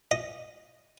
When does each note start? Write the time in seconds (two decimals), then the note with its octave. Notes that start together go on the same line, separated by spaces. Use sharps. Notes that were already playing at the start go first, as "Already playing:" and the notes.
0.11 D#5